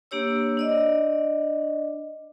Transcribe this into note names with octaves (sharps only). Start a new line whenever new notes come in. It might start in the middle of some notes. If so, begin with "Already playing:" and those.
A#3 D4 G4 C#5 E6
D4 D5 D#5